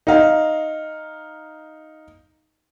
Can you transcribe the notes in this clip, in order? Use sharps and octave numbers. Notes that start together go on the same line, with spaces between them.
D#4 F5